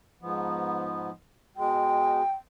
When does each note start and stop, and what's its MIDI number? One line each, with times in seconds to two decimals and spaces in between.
0.22 1.10 44
0.22 1.10 53
0.22 1.10 59
1.57 2.22 47
1.57 2.22 56
1.57 2.32 79